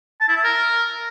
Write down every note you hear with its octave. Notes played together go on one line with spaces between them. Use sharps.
A5
E4
E5
A#4